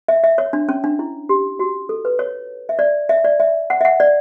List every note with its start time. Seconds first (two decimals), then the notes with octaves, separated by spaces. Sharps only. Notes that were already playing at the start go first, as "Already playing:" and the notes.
0.08 E5
0.24 E5
0.38 C#5
0.53 D4
0.69 C#4
0.84 D4
0.99 E4
1.29 G4
1.59 F#4
1.89 A4
2.05 B4
2.19 C#5
2.69 E5
2.79 D5
3.09 E5
3.24 D5
3.40 E5
3.70 F#5
3.81 E5
3.85 F#5
4.00 D5